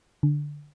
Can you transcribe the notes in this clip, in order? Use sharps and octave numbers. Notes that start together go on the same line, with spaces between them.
D3